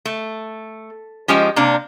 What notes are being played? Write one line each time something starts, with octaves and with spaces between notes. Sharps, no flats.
A3
F3 G#3 C#4 G4 D#5
C3 A#3 D4